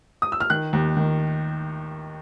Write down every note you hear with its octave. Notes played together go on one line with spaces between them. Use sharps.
D#6
E6
F6
D#3 F#6
D#2
D#3